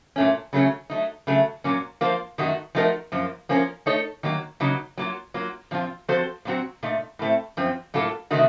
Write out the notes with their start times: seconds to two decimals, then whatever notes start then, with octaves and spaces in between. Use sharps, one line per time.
0.16 A#2 F#3 A3 C#4
0.53 C#3 F#3 A3 C#4
0.90 F#3 A3 D#4
1.27 C#3 F#3 A3
1.64 A#2 F#3 A#3 C#4
2.01 F3 A#3 F4 C5
2.38 F#2 D#3 A3 D#4 F#4
2.75 F3 A3 D#4 F#4 A#4
3.12 F#2 F3 A#3
3.49 F3 A#3 C#4 F4 A#4
3.86 A3 D#4 A4 C#5
4.23 D#3 F#3 A#3
4.60 C#3 F#3 A#3 D#4
4.98 F#3 A#3 F4
5.34 F#3 A#3 F4
5.71 A#2 F3 C4 F4
6.08 F3 C4 F#4 A4 C5
6.45 A#2 F#3 C4 F#4
6.83 A#2 A3 D#4
7.19 A2 A3 C4
7.57 F#2 F3 C4
7.94 A2 F#3 A#3 F4 A4
8.31 C3 D#3 A3 D#4 F#4